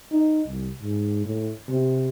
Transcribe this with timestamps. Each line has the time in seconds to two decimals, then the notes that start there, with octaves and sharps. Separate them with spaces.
0.12 D#4
0.47 C2
0.82 G#2
1.25 A2
1.69 C3